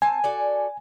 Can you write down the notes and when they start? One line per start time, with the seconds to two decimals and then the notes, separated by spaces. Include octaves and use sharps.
0.02 C4 G#5 A5
0.24 F#4 A4 D5